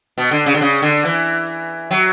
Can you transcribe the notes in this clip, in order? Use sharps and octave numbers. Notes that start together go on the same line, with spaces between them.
B2
D3
C#3
D3
C#3
D3
E3
F#3